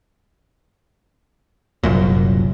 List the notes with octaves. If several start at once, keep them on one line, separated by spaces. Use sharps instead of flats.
F#1 C2 F#2 A#2